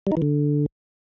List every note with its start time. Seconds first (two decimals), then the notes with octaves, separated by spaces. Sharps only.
0.07 G3
0.12 D#4
0.17 E3
0.22 D3